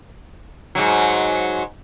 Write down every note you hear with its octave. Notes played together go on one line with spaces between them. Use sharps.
G#2 F#3